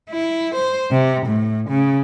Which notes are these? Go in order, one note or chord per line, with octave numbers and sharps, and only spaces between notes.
E4
C5
C3
A2
C#3